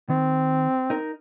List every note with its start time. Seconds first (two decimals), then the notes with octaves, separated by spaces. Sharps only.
0.10 D#3 C4
0.90 D#4 A#4